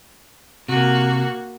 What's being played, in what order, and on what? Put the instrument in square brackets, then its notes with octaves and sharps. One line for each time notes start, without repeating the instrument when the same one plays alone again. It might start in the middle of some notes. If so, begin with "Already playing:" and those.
[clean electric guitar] C3 [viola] A#3 F#4